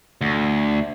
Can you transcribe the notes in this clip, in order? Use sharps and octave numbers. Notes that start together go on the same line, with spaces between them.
D2